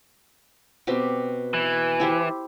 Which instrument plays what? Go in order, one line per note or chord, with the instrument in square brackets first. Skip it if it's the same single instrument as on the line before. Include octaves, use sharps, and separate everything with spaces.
[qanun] B2 C4 G4
[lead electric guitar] E3
[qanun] E4 G4 C5